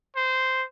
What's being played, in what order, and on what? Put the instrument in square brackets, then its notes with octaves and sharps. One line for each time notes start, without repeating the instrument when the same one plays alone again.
[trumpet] C5